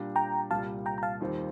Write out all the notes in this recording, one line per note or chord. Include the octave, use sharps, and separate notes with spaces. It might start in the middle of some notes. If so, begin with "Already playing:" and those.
Already playing: A#2 G3 D4
G5 A#5
C2 A#2 G3 F5 A5
G5 A#5
A#5
F5 A5
D#2 D#3 G3 C4 F4